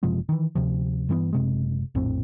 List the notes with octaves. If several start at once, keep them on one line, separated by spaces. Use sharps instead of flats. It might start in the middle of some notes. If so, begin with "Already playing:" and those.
F#1 C3 F3 G#3
D#3 E3
D2 C3 F3
G2 E3 A#3 B3
F#1 C3 G#3
A#1 F2 A2 C4